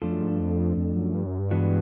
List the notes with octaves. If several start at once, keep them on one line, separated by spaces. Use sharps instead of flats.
F2 F3 A3 D4 F4 A4
F#2
G#2
G2
F2
F2
F#2
G2
F#2
G2
E3 G#3 B3 D4 F#4